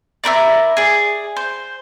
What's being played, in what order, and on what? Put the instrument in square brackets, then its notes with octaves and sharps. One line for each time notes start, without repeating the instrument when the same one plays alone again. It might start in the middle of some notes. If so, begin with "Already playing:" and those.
[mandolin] E4 F#4 A#4 D5
G#4 D5
C5